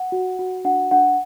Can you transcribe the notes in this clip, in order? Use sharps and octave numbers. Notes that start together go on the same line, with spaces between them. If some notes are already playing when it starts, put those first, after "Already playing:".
Already playing: F#5
F#4
F#4
D4 F#5
D4 F#5